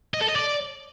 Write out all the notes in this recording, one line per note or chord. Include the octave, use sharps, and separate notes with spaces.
D#5
A4
D#5
D5